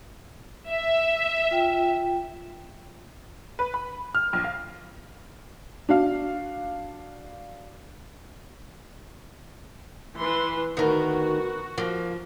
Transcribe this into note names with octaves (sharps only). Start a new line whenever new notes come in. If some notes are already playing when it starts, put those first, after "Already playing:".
E5
F4 G5
B4
B5
F6
A#1
F5
D4 F#4 F5
E3 B4 C6
D2 D#3 B3 D#4 F#4 A#4
F3 A#3